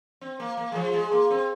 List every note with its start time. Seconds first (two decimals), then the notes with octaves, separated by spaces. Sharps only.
0.21 C4
0.40 A#3
0.57 A#3
0.72 G#3
0.75 F3
0.93 G#3
1.12 A#3
1.30 C4